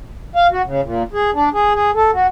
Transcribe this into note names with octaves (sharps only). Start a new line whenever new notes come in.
F5
F#4
C#3
A#2
G#4
D4
G#4
G#4
A4
F#4